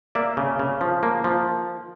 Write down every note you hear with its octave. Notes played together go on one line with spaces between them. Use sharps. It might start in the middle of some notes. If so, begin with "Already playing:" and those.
A#3 D5 E5
C#3
C#3
F3
A#3
F3